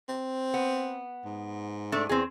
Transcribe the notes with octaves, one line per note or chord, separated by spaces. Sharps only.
C4
B3
G#2
A3 D4 D5
E2 C4 G#4